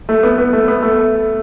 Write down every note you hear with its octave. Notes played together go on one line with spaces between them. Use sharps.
A3
B3
B3
A3
B3
A3